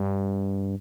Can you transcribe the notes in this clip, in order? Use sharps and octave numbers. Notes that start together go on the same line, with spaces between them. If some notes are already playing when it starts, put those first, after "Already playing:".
Already playing: G2